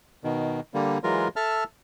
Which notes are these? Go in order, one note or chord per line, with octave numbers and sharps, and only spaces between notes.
B2 D#3
D3 G3 A#3
E3 F#3 G#3 F4 A#4
A4 E5 A5 F6